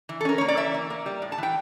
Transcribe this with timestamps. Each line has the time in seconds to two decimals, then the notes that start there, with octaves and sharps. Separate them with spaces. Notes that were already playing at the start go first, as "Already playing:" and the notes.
0.09 E3
0.21 A4
0.25 C#4 A#4
0.38 A#3 C#5
0.48 D5
0.57 E3 E5
0.74 A#3
0.90 A#3
1.06 G3
1.22 A2
1.32 A5
1.38 E3 G5